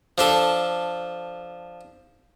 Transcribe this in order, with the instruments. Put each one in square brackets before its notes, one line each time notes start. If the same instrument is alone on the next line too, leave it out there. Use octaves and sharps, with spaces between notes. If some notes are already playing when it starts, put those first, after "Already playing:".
[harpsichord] F3 D4 A4